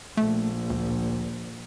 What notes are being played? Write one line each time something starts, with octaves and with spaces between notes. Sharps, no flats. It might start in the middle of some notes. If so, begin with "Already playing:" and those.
A#1 A3
D2